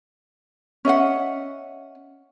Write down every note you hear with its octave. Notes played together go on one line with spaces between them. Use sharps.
C#4 D#5 E5 F#5